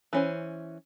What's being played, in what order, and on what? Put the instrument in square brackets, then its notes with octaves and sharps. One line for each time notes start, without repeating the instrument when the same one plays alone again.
[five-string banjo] E3 C#4 C5